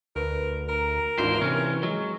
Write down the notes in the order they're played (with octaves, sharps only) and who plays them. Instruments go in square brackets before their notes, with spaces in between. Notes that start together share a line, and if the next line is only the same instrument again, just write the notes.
[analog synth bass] D2 [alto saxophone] A#4 [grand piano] B4
[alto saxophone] A#4 [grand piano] A#5
[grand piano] G#1 D4 F4 [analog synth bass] E3 [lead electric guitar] C5
[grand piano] C3 [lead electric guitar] C#4
[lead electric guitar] F#3 [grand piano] G#3